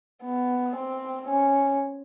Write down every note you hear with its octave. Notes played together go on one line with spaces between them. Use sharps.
B3
C4
C#4